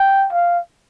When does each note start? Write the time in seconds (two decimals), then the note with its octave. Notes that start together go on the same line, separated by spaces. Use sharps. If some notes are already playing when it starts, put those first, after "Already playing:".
Already playing: G5
0.33 F5